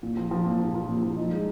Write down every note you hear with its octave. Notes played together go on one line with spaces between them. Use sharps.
A#2
F3
F3
A#2
F3
F3
A#2
F3
D#4
G#3